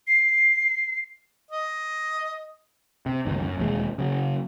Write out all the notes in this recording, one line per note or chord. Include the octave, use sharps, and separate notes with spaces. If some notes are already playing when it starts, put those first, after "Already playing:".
C7
D#5
C3
G1 C#2 G2 D#3
F#2
E1 D#2 D3 G#3
C#3 F#3